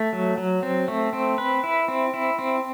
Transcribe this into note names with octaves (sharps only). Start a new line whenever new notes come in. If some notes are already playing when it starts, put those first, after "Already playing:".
Already playing: A3
F#3
F#3
C4
A3
C4
B4
E4
C4
E4
C4